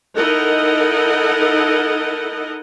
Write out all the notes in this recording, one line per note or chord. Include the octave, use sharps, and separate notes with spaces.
D#4 E4 A4 A#4 D#5 F#5